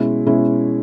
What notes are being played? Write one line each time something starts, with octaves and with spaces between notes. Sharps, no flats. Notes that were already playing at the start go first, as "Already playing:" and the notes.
Already playing: B2 G#3 C#4 E4
B2 G#3 C#4 E4